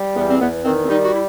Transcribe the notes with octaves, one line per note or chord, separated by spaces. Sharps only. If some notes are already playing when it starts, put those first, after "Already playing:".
Already playing: G3
E2 B3
C4
E2 B3
D#3 C4
C4
G3 D#4
F#4
E4